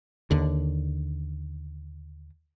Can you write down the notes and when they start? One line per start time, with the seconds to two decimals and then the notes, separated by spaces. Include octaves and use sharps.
0.31 D#2 D3